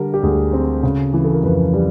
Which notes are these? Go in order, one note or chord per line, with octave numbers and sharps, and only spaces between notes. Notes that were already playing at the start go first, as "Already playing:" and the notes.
Already playing: D3 G3 A#4
G4
D2 G#4
C4
C#3
E3
A4
A#4
F2 B4
G3